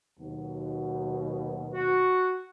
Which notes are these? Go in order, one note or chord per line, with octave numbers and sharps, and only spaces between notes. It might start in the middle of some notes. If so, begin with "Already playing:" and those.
D#2 B2 F#3
F#4